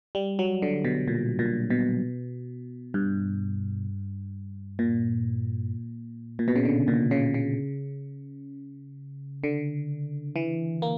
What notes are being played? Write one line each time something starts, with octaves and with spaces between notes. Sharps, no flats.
G3
F#3
D3
B2
A#2
A#2
B2
G2
A#2
A#2
B2
C#3
D3
A#2
C#3
C#3
D3
E3
A#3